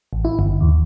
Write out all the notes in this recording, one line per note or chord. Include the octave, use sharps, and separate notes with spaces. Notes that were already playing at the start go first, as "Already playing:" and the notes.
A1
E4
G1
D#2